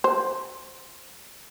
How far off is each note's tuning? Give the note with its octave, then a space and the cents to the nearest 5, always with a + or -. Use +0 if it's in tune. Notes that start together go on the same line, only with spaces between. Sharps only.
C5 +5